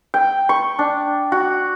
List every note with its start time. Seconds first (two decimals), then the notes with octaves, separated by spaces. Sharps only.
0.14 G5
0.49 C#6
0.79 D4
1.32 F#4